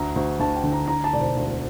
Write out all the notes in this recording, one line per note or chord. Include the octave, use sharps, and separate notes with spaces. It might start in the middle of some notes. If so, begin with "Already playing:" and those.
Already playing: D2 A#5
D2
D2 A5
G5
D3
A#5
D3 A#5
A5
E1 D5
C5
D2